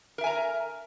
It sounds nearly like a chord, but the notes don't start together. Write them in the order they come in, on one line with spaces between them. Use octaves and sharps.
A#4 E5 G#5 A#5